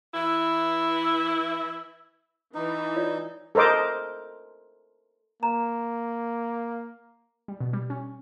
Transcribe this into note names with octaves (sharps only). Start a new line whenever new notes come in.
E3 E4
E3 D#4
F4 C#5 D5
A4 A#4 C5 D#5 D6
A#3 A#5
G3
B2
G3
C#4